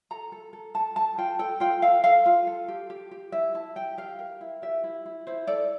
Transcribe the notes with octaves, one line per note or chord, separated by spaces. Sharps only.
A4 A#5
A4
A4
A4 A5
A4 A5
F4 G5
A4 G5
F4 G5
A4 F5
A4 F5
F4
A4
G4
G4
G4
E4 E5
E4 A5
G4 G5
G4 F5
A#4
E4
G4 E5
E4
E4
E4 C5
A4 D5